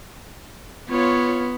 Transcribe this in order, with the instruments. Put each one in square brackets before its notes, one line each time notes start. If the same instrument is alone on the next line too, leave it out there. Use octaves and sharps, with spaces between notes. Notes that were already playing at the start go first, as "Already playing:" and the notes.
[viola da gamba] B3 [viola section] F4 C#5